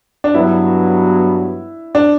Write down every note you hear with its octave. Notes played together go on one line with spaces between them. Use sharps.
D4
G2 F#3 B3 E4 F#4
D4